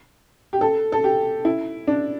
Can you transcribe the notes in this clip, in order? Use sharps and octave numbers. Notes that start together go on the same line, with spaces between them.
G4
A4
A4
G4
E4
D4